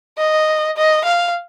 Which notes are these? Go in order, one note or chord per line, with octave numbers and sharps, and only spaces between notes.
D#5
D#5
F5